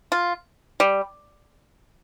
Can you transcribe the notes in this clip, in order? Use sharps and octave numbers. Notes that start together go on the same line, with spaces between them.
F4
G3